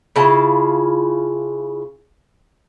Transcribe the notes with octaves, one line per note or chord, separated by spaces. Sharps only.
C#3 E4 F4 A5